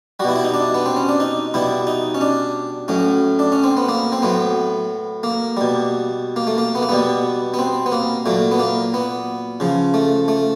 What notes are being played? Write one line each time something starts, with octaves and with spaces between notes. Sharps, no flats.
B2 G3 E4 F#4
E4
D#4
D4
B3
C4
C#4
D4
D#4
B2 G3 E4
D#4
C#4
D4
A2 F#3 C#4
D4
C#4
C4
B3
A#3
C4
A2 F#3 B3
A#3
B2 G3
A#3
A3
A#3
B3
A#3
B2 G3 B3
B3
C4
B3
A#3
A#2 F#3 A3
B3
A#3
B3
C#3 F3
A3
A3